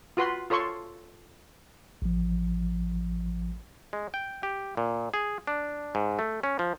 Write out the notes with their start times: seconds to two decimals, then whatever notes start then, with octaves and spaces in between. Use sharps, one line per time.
0.17 F4 F#4 B4 C6
0.50 F4 A4 C#5 C6 C#6
2.02 A1 F3
3.93 G#3
4.14 G5
4.43 G4
4.77 A#2
5.14 G#4
5.47 D4
5.95 G#2
6.19 A3
6.43 C#4
6.59 F3